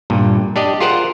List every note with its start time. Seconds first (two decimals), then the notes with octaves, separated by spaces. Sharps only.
0.10 G2 A#2
0.56 D4 G4 D5 D#5
0.80 F4 G#4 A#4 C5 F#5